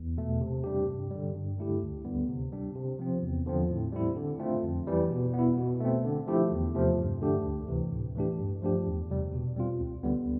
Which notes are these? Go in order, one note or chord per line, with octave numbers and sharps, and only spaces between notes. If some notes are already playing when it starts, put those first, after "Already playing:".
Already playing: E2
B2 A3
C3
G3 D4 G4
G2
D3 G3
G2
D3 A3 E4 G4
D2
D3 G3 B3
C3
G3 D4
C3
F3 C4
E2
D3 F3 C4
A2
G3 C4 E4
D3
A3 C4 F4
F2
E3 G3
B2
B3 E4
B2
A3 C4
D3
F3 A3 E4 G4
E2
C3 F3 A3
G2
D3 A3 D4 G4
D2
C3 E3
A2
E3 A3 D4 G4
G2
F3 A3 D4 G4
E2
C3 G3
B2
G3 C4 F4
D2
D3 G3 B3